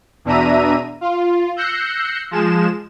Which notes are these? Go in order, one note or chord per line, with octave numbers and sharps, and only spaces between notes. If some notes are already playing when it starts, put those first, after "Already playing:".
E2 B2 D4 E5 A#5 D#7
F4
E6 F#6 G6 A#6 C7 C#7
F3 G#3 E7